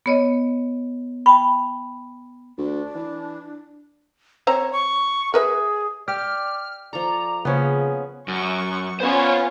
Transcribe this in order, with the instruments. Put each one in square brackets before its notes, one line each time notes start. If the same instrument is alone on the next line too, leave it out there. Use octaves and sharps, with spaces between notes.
[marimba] B3 C#5 D#5
[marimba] G5 A5 [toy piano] B5
[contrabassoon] D2 [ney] D4
[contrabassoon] E3
[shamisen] C4 C5 A#5 [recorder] C#5
[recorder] C#6
[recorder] G#4 [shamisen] A#4 B4 E5
[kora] G4 [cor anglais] D5 [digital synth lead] F6
[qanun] F3 A4 [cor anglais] D5 [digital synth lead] A#5
[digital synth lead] C#3 [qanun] F3 A#3 [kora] B3 C#4 C#5 [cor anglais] G#4
[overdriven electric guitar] F#2 [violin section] C#6
[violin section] B3 C#4 F4 [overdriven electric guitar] C5 C#5